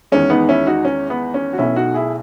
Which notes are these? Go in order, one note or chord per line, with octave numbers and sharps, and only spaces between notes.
E2 D#3 G#3 C#4
B3 D#4
C#4 E4
D#4 F#4
C#4
B3
C#4
F#4
B1 B2 A3 C#4 E4
D#4 F#4
E4 G#4